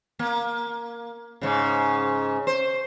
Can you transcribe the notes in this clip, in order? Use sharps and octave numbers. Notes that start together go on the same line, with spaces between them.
A#3
G#2 C#3
C5